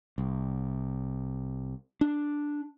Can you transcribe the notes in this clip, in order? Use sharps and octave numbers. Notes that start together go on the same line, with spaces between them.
C2
D4